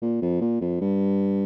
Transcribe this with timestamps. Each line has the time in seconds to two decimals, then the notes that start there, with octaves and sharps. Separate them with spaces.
0.02 A#2
0.22 F2
0.41 A#2
0.61 F2
0.81 G2